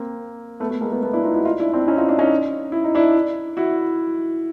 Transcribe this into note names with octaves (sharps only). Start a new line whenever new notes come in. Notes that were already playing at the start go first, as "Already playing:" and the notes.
Already playing: A#3 C4
A3 B3
A3 B3
G#3 A#3
A3 B3
A3 B3
D4 E4
D#4 F4
E4 F#4
D#4 F4
D4 E4
C4 D4
C#4 D#4
D#4 F4
D4 E4
C#4 D#4
E4
D#4
D4 E4
E4 F#4